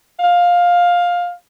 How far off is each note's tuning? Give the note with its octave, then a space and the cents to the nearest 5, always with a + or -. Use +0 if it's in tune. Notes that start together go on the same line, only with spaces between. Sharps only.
F5 +15